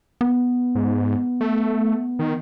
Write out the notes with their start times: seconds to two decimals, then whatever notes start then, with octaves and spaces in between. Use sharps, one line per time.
0.21 B3
0.75 G#2
1.41 A3
2.19 D#3